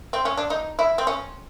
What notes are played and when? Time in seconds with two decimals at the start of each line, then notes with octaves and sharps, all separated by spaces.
0.13 C4
0.25 C#4
0.37 D4
0.50 D#4
0.79 E4
0.98 C4
1.07 C#4